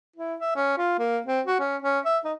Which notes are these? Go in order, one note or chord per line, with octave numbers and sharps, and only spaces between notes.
E4
E5
C#4
F4
A#3
C4
F#4
C#4
C#4
E5
D#4